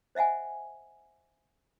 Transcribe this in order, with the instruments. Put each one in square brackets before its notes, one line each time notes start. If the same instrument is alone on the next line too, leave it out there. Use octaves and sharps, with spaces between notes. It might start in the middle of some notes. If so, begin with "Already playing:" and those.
[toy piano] C5 D#5 E5 F#5 G#5